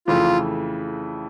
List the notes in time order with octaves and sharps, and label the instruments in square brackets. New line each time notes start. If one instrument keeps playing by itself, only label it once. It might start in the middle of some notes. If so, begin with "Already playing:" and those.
[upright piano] F2 C#3 E3 A3 [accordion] F4